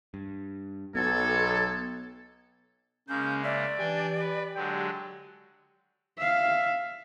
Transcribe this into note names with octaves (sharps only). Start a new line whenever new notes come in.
G2
B1 B3 A4 G#6
C#3 G#3 A#3 C#4 G6
D5 E5 A#6
E3 D4 G4 G5 G#5
B4
D3 F#3 G#3 G5
E5 F5